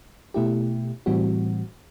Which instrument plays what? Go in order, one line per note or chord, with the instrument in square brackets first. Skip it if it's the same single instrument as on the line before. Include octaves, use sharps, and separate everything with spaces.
[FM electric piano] B2 A3 E4 G4
A2 E3 G3 C4 F#4